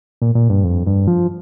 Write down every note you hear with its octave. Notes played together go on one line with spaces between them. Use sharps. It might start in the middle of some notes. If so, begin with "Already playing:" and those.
A#2
A#2
G2
F2
G2
F3